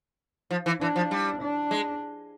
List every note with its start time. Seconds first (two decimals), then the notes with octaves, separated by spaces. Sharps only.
0.51 F3
0.66 E3
0.80 E3 D4
0.96 F3
1.11 G3
1.41 D4
1.71 G#3